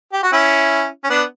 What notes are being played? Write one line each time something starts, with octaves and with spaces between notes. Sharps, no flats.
G4
F#4
C#4 E4
C#4
B3 D4